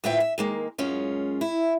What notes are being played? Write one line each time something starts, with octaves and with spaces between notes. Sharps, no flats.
D2 A2 B3 F4 E5 G5
E5
D#3 G#3 A#3
F#2 G#3 C#4 F4
E4